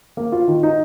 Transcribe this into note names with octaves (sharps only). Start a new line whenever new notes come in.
A#3
F4
D#3
D#4